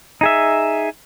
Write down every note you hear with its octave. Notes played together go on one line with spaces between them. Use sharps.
D#4 G#4 E5